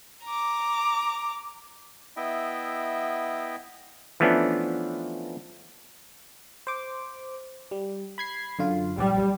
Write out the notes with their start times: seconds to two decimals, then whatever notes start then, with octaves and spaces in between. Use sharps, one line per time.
0.24 A#5 D6
2.17 B3 E4 D#5 E5 G5
4.20 E3 F3 A3 B3 C#4 D4
6.67 C5 D6
7.71 G3
8.18 B5 G#6 C7
8.59 F#2 D3 F4
8.98 A#1 G3 D5